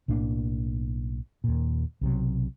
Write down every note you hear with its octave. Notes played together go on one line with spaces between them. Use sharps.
B1 A2 A#3 D4
D#2 A#2
B1 C3 F#3